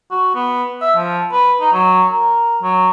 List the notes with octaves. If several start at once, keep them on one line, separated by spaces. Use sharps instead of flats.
F#4
B3
E5
F3
B4
D#4
F#3
A#4
F#3